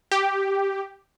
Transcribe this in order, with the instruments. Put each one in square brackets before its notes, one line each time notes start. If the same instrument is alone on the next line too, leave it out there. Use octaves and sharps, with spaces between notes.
[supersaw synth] G4